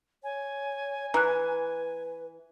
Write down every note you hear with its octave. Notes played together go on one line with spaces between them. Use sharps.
C#5 G#5
E3 B4 A#5 F#6